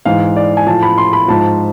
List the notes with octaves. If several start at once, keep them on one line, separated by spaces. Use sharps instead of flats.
G#2 E3 F5
D5
G#5
A2 F3 A5
B5
C6
B5
G#2 F3 A5